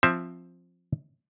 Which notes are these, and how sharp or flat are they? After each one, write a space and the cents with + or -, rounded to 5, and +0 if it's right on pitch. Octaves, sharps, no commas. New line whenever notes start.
F3 +5 C4 +10 E5 +0